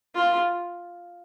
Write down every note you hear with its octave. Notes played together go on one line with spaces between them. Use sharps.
F4